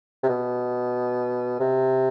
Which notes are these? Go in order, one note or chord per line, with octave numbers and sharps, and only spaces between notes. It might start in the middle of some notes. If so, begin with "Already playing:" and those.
C3
B2
C3